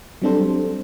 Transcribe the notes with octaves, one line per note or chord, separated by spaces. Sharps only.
F#3 G3 C4 D4 A4 C5